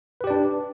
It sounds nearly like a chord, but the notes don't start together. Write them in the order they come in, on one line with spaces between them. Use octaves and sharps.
B4 G4 D5 D4